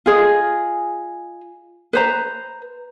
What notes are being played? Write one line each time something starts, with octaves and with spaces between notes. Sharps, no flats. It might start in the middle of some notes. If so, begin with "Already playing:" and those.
F4 G#4 D#5
B4 C5 A#5